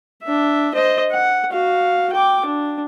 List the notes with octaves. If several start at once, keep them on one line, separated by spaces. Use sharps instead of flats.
D4 E5
C5 D#5
F#5
F#4 F5
G5 D6
D4